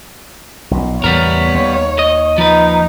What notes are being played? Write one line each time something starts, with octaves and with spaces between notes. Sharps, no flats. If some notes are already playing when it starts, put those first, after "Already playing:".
B1 A#2
E2 A2 C#3 G3 B3 A#4 C#5
D#2
D#5
F3 D#4 B4